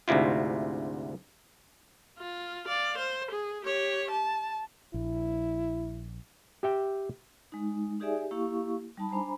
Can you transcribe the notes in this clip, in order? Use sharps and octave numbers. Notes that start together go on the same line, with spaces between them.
D2 G#2 C3 E4 F4
F4
D5 F5
C5
G#4
G4 C#5
A5
A#1 E4
G4 E5 G5
G#3 D#4
D#4 G4 G#4 D5 E5 G#5
G4
A#3 E4 G4 F5 C#6
G3 D#4 A5 B5
D4 C5 G#5 A#5 B5